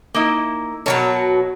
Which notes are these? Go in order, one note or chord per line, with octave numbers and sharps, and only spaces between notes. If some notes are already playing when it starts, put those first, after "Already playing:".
A#3 D#4 E4
B2 F#3 A#4 C#5 A5